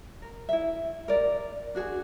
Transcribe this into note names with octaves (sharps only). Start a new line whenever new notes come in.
A#4
E4 E5
A#4 D5
D4 F#4 G#4